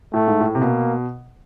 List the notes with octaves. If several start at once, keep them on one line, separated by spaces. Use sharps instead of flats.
A2 A3
G#2
A2
C3
B2 A#3